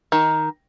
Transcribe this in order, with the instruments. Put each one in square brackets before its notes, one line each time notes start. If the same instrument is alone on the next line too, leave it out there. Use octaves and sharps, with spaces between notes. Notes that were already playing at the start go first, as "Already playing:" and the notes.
[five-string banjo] D#3